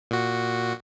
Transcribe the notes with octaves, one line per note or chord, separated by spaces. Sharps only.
A#2 F#4